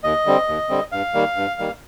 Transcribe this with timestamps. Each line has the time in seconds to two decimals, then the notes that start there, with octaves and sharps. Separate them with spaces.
0.04 D#2 D#5
0.26 D3 G3 C4
0.48 D#2
0.69 D3 G3 C4
0.92 G2 F5
1.14 D#3 G3 A#3
1.36 G2
1.59 D#3 G3 A#3